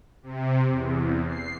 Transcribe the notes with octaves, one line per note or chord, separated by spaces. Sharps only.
C3
E2
C7